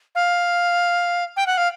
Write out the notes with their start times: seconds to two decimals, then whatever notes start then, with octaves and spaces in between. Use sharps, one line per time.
0.15 F5
1.37 G5
1.47 F#5
1.58 F5